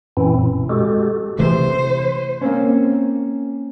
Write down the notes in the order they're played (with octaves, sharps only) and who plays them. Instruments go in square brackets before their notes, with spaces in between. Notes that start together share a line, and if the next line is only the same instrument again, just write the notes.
[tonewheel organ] F#2 A#2 E3 C4 C#4 E4
B2
G#3 F#4 G4 A4
[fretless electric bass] C3 E3 A3 [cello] C5
[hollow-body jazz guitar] A#3 C4 C#4